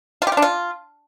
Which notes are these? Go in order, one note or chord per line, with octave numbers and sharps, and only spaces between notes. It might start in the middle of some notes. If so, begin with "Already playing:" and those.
F4
G4
F4
D4
F4